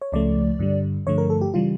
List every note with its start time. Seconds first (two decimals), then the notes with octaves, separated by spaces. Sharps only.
0.02 C#5
0.12 C#2 C#3 F3 A3 D5
0.59 G2 D3 G3
1.07 G2 D3 F3 A3 C#5
1.18 A#4
1.30 A4
1.41 G4
1.54 C#3 E3 G3 F4